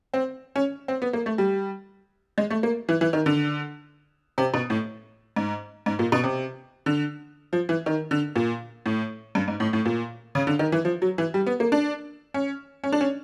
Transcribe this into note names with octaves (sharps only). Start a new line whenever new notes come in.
C4
C#4
C4
B3
A#3
A3
G3
G#3
A3
A#3
E3
E3
D#3
D3
C3
B2
A2
G#2
G#2
A#2
B2
C3
D3
F3
E3
D#3
D3
A#2
A2
G2
G#2
A2
A2
A#2
C#3
D3
D#3
E3
F3
F#3
E3
G3
B3
A#3
D4
C#4
C#4
D4
C#4